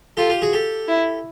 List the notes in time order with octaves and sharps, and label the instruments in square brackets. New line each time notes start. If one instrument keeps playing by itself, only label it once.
[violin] F4 [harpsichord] G4 A4
[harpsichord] F4 G4
F#4 G#4
G4 A4
[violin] E4